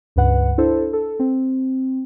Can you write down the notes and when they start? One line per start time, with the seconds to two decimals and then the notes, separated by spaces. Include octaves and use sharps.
0.16 C#2 G2 B4 F#5
0.58 D4 E4 A4 C5
0.93 A4
1.19 C4